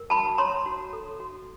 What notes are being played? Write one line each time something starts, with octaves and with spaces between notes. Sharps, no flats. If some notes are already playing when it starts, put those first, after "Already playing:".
Already playing: A#4
F#4 A5 B5
C#5 A#5 C6
F#4
A4
F#4